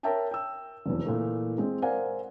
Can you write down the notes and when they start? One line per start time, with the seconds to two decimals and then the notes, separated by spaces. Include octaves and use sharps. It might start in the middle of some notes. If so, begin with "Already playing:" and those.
0.03 A#4 C#5 E5 G5 A5 A#5
0.31 G5 E6
0.86 F1 B1 E2
1.06 A#2 E3 A3
1.58 G#3 C4
1.82 A#4 C5 D5 F5 F#5 G#5